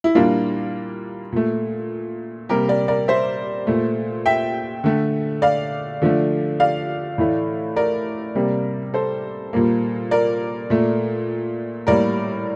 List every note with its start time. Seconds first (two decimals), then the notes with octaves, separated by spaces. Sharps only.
0.04 E4
0.15 A#2 G3 A#3 D4 F4
1.32 A#2 A3
2.49 C3 G3 A#3 G4 A#4
2.69 A#4 D5
2.88 A#4 D5
3.08 C5 E5
3.67 A#2 A3
4.26 E5 G5
4.84 D3 A3
5.42 D5 F5
6.02 D3 F3 A3
6.60 D5 F5
7.18 A2 E3 A3
7.76 A#4 D5
8.35 C3 G3 A#3
8.94 A4 C5
9.53 A#2 G3 A#3
10.11 A#4 D5
10.70 A#2 A3
11.87 A2 G3 A#3 A#4 D5